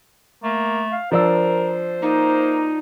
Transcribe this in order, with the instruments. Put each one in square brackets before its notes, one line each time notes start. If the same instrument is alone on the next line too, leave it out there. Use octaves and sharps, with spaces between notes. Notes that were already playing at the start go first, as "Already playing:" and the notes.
[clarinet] A3 [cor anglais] A#3
[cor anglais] F5
[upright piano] F3 D4 E6 [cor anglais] A#4 [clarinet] C5
[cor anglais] A#3 [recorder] D#4